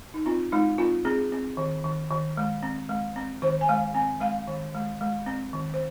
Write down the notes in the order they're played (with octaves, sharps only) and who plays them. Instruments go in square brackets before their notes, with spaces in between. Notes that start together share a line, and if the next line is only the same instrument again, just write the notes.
[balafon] D#4
C4 F4
G#3 D#4
C4 F4
C4 G#4
C4
D#3
D#3
D#3
G#3
C4
G#3
C4
D#3 C5
G#5
G#3 F5
C4 G#5
G#3 F5
D#3
G#3
G#3
C4
D#3
C5